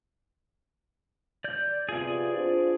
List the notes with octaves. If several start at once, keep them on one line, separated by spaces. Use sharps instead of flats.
D5 G6
C3 B3 F4 G#4 D5
D4 F4 C5